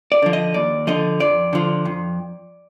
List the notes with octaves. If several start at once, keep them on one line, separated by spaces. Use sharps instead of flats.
D5
D3 F3
D#5
D#2 D5
D3 F3 D#5
F2 D5
D3 F3
F2